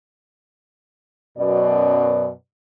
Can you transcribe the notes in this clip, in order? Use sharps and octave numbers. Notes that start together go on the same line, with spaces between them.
F#2 B2 D5